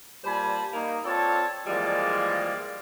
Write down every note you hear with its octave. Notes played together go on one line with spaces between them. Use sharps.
A#2 G3 C5 G#5 A5 B5
A#3 D#4
C4 F4 A4 C#5 D5 A5
E3 F3 G3 G#3 A#3 D5